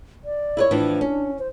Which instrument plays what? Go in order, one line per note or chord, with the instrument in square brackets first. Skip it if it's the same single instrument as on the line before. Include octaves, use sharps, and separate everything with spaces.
[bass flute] D5
[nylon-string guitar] E4 B4 C#5
[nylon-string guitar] A2 E3 F3 [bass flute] D4
[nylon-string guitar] C#4
[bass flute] C5